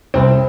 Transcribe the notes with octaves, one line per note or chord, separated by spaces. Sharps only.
C2 C4